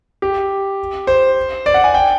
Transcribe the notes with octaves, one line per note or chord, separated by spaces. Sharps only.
G4
C5
D5
F#5
G#5
G5